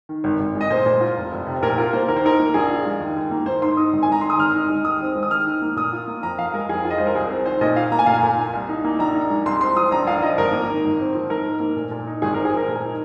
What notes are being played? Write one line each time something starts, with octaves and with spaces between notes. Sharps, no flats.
D#3
G#1
G#1
G#3
D#5
A#2 C5
A#2
F4
F1
F1
C3
A#2 A#4
F4 A#4
A#3 C5
D#2 A#4
C5
D#4 A#4
A#3
A#1 G#4
F4
G#3
D#2
D#2
A#3
G#2 C5
G#2 C6
D#4 D#6
G#1
G#5
G#3 A#5
D#3 C6
D#6
G#1 F6
D#4
G#3
D#2 D#6
C4
G#3
D#6
D#2 F6
D#4
A#3
A#2 D#6
F4
A#3
F2 A#5
F2 F5
G#3 A#4
F2 G#4
F4
D#5
G#3 C5
A#4
C2 G#4
C4
D#3 C5
A#2 D#5
F4 F5
A#3 A#5
G#5
A#2 F5
G#5
A#2
F4
C2
D#4
A#3
A#1 A#5
D#4
G#3
C2 C6
C4 C6
F3 D#6
A#1 A#5
A#1 F5
F3 D#5
G#1 A#4
A#3
D#3
G#1
C4
F3
G#2 A#4
G#2
A#3
A#2
A#2
D#4
G#1 G#4
A#4
C4
G#4
F3 A#4
A#2
D#4